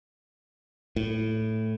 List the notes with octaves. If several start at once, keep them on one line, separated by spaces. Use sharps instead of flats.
A2